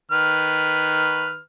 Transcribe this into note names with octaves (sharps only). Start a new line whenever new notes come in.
D#3 B4 F6